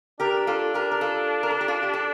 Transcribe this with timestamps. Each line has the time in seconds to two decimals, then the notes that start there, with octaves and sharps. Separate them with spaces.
0.20 D4 G4 A#4
0.47 F4 A4
0.74 G4 A#4
0.91 A#4
1.01 F4 A4
1.43 A#4
1.51 A4
1.61 G4
1.68 F4 A4
1.83 G4
1.94 A4